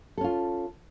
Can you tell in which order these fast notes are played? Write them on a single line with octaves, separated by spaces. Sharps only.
A4 C#4 F4